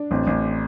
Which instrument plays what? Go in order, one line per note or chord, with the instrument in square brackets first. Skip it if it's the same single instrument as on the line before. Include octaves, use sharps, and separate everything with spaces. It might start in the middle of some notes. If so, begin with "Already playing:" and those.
Already playing: [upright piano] D4
[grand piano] A1 [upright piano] C4
[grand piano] A1